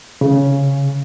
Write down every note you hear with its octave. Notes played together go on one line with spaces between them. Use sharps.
C#3